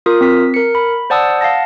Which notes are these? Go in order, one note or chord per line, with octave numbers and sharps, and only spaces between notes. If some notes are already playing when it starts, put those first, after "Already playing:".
F4 A#4 D#6
C4 B6
A#4 C#7
B5
C5 D5 F#5 A5 D#6 E6
F5 F#5 A5 A#6